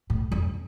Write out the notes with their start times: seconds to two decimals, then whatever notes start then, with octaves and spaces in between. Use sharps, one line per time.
0.10 A2
0.32 F2